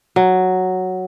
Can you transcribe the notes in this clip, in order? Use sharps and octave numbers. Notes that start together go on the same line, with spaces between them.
F#3